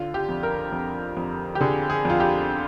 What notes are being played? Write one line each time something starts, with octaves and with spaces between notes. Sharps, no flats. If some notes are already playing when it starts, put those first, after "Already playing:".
Already playing: D3 F4
G4
F2
A#4
F2
F2
G4
D3 G#4
G#4
F2 F4
G4